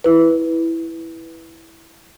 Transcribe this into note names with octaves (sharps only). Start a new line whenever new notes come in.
E4 B4